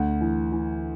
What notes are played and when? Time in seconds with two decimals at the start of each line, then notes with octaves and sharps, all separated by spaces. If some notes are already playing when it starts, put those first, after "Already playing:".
Already playing: D2 F#5
0.21 E3
0.52 E3